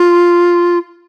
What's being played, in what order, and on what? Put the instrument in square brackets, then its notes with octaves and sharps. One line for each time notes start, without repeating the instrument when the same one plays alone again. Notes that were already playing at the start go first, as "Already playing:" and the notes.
Already playing: [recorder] F4